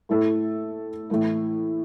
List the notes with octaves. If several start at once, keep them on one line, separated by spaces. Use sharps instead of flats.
A2 A3 E4 A4
A2 E3 A3 E4